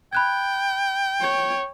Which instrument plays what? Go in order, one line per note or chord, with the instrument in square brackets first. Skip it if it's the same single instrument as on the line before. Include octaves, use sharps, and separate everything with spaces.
[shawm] G5 [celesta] B5 F#6 G#6
[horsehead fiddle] C#5